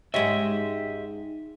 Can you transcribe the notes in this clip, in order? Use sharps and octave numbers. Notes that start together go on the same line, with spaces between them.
G#2 G#3 C#4 G4 D#5 E5